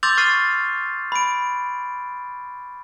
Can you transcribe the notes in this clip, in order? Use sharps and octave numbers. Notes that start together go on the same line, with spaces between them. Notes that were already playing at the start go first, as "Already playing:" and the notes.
C6 D6 E6 G6 A6 F7
C#6 F6 A6 C7 D#7
B5 D7